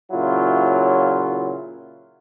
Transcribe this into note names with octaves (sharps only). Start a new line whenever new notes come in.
A#2 C#3 F#3 E4 F4